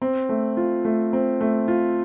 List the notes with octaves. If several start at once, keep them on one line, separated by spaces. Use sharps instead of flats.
C4
A3
F4
A3
C4
A3
F4